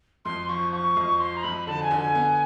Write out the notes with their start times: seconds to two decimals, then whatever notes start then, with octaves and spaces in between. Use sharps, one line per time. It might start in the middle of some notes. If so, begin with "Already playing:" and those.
0.25 F2 C6
0.49 F3 C#6
0.72 F3 C#6
0.97 F2
1.20 F3 C6
1.37 A#5
1.43 F2 B5
1.67 D3 A5
1.83 G#5
1.91 D3
1.99 G#5
2.15 B3